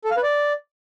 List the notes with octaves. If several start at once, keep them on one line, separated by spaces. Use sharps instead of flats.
A4
F5
B4
D5